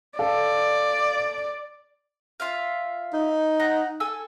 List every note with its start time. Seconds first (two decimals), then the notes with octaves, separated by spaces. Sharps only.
0.19 A4 D5 F5
2.40 F4 E5 F5
3.13 D#4
3.60 F#5 A#5
4.00 A4 G#5 E6